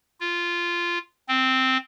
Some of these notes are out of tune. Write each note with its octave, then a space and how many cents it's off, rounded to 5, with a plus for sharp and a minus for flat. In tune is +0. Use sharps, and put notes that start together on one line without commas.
F4 -10
C4 -5